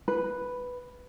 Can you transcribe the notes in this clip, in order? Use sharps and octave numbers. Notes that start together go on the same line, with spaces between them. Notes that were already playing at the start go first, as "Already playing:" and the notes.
B4